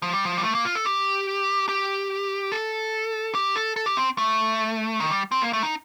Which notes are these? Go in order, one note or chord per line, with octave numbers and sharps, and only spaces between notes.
F3
G3
F3
G3
A3
A#3
F4
A4
G4
G4
A4
G4
A4
A4
G4
C4
A3
D#3
G3
C4
A#3
A3
D#4